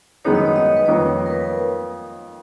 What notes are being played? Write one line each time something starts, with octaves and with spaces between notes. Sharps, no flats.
F#2 D#3 G#3 B3 D#4 C#5
D#5
C#5
D#5
C#5
B4
F2 D#3 A#3 C#5
A#4
B4
A#4